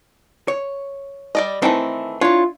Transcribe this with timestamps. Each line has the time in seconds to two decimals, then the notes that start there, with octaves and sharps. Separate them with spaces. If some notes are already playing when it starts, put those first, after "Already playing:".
0.48 C#5
1.35 G3 D5 D#5
1.62 D#3 E3 A3 C4 E4
2.21 D4 E4 F4 C#5